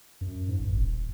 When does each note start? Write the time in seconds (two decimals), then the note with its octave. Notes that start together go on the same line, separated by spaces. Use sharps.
0.21 F#2
0.48 G#2
0.59 G#1
0.76 D#1